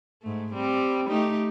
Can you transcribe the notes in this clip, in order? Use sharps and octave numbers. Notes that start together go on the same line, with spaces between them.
G#2 A3
G3 C4
A3 D#4 G4